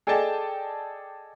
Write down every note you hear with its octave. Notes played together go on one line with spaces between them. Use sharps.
G#4 A4 D5 D#5 G5 A5